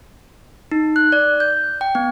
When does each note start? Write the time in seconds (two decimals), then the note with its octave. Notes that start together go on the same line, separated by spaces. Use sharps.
0.71 D#4
0.96 F#6
1.12 D5
1.40 G6
1.81 G5
1.95 B3